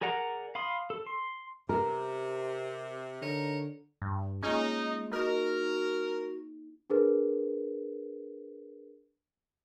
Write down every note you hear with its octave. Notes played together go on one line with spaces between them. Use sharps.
G#4 A#4 D5 F#5 A#5
F5 B5 C6 D#6
A4
C6
C3 A#4
D3 D#4 A#4 C#5
G2
G#3 A#3 C#4 D#4 F4 G#4
D#4 F#4 A#4
D4 G#4 A#4 B4